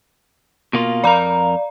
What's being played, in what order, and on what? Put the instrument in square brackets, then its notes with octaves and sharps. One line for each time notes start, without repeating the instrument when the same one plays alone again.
[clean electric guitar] B2 A#3 F4
[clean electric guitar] F2 A#4 [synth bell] D5 F5 A#5